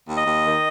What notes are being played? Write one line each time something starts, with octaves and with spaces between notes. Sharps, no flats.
D#2
D#5
D#2
D#3